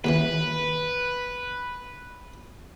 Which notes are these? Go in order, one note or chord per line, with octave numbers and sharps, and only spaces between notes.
D#2 C#3 E3 B4